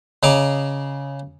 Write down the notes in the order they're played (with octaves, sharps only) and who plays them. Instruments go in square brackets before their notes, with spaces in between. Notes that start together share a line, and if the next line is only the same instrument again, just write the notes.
[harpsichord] C#3 D#5 A#5 D6